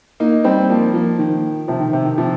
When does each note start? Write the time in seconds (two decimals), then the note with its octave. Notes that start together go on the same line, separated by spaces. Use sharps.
0.20 A#3 D#4
0.44 G3 C4
0.70 F3 A#3
0.94 F3 A#3
1.19 D#3
1.68 C3 F3
1.80 D#3
1.93 C3
2.05 D#3
2.18 C3 F3